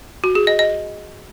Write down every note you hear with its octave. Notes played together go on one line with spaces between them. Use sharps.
F#4
G#4
D#5
D#5